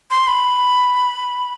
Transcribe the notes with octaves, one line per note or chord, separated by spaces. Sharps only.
C6
B5